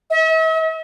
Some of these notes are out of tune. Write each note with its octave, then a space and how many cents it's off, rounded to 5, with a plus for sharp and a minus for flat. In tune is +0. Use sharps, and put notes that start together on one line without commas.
E5 -45